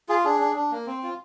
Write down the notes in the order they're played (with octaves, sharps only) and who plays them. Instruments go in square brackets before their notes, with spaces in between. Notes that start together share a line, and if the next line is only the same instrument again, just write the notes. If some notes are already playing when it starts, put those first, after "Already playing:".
[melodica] F4 G#4
D4 G#4
D4
D4
A#3
C4
F4